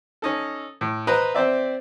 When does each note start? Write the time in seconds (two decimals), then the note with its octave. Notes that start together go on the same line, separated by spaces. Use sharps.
0.22 C#4 D#4 A4
0.81 A2
1.07 B4 C5 D#5 A#5
1.34 C4 C5 D5 E5